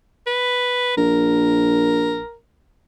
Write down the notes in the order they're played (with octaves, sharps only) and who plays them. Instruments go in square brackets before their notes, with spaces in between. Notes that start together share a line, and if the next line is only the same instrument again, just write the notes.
[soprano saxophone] B4
[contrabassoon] A#1 [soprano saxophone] A#4